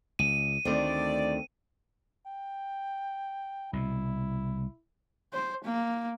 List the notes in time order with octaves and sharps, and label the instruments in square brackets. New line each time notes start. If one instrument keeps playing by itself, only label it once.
[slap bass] C#2 [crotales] D#7
[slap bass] D2 D#3 [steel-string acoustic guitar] A3 C4 [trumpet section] D5
[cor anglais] G5
[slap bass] C2 B2 [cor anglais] E4
[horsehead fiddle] C5
A#3